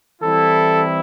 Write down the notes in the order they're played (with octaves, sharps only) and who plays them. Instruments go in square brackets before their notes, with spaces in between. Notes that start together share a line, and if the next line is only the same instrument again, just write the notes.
[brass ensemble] E3 G3 C4 E4 [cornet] A4